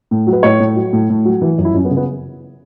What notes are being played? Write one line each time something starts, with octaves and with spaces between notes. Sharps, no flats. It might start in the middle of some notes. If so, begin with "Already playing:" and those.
A2
F#3
B4
A2 C#5
A2
F#3
A2
A2
F#3
E3
F#2
E4
F#2 C#4
B3
C#3
B3